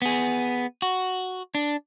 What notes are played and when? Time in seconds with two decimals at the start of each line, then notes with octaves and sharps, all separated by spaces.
0.02 B3 G#4
0.82 F#4
1.55 D4